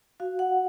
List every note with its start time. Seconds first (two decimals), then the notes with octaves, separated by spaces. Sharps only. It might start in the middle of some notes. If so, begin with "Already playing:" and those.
0.20 F#4 F5
0.39 F#5